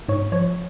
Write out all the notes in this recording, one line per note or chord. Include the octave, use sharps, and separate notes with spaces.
G#2 C#5 C#6
F3 C#5 C#6